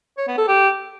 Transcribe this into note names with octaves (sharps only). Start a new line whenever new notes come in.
C#5
B3
A4
G4